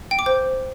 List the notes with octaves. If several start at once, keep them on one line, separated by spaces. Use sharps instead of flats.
G5
D6
C5